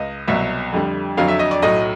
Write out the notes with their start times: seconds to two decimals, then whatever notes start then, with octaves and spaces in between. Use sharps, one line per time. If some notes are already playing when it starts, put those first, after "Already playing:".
Already playing: C#2 D#5
0.27 C2 B2 F#3 E5
0.73 F2 D3 G3
1.17 F2 D3 F#3 F5
1.28 E5
1.39 D#5
1.51 D5
1.62 B1 A2 F#3 D#5